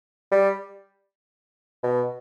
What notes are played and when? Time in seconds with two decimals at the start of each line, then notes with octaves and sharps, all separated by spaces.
0.31 G3
1.83 B2